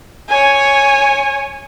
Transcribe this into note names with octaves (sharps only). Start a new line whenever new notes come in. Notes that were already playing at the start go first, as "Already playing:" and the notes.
C#5 G#5